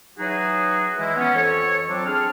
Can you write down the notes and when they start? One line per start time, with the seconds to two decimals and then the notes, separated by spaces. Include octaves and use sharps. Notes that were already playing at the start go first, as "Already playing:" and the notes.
0.18 E3 F#3 D#4 F#4 G#4
0.98 E3 G#3 E4
1.16 B3 C#4
1.34 F2 E3 A4 C#5
1.89 F3 F#3 C4 D4 A4
2.06 C4 D4 G#4 F6